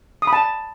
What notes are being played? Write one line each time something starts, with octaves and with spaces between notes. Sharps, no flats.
D#6
B5
A5